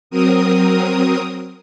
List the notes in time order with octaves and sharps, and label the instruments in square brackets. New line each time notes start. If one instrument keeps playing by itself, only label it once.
[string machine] F#3 C4 A#4 D#6